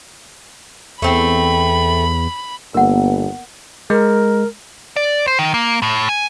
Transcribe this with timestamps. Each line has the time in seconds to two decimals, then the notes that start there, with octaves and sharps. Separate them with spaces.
1.02 E2 A3 C4 B5
2.74 G1 A#3 B3 A#4 F#5
3.90 G#3 A#4
4.96 D5
5.27 C5
5.39 D#3
5.54 A#3
5.82 A2
6.09 G#5